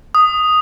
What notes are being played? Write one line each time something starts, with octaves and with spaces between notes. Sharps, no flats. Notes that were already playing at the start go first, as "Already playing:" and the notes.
D#6